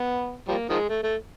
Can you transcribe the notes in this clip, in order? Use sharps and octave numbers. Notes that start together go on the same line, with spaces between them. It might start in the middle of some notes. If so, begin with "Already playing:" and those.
Already playing: B3
F3 G3 A#3
D#3 F3 G#3
A3
A3